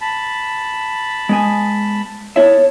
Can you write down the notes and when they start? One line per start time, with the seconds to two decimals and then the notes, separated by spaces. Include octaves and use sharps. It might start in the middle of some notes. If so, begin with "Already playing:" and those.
0.01 A5 B5
1.29 G#3 B3 G#5
2.36 B3 E4 C#5 E5 A5